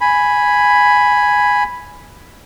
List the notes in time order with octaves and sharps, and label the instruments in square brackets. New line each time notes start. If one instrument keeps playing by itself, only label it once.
[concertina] G#5 B5